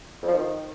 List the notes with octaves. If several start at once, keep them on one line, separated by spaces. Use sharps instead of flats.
F2
F3
D#3